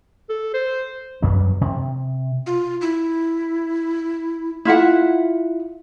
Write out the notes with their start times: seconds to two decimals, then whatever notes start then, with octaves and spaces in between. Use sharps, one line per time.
0.30 A4
0.54 C5
1.22 F#2 F#3 G3 B3
1.61 C3
2.46 F4
2.81 E4
4.65 E4 F4 E5 F#5